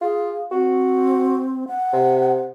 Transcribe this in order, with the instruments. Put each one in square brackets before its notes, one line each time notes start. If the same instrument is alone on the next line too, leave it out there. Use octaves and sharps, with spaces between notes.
[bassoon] F4 [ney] G#4
[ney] C4 [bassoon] F#4
[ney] F#5
[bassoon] C3